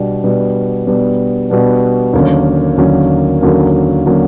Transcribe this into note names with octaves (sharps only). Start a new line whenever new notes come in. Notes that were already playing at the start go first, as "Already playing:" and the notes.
Already playing: B2 G3 B3 D4
B2 G3 B3 D4
B2 G3 B3 D4
B2 G3 B3 D4
D#2 D3 F#3 A#3 C#4
D#2 D3 F#3 A#3 C#4
D#2 D3 F#3 A#3 C#4
D3 F#3 A#3 C#4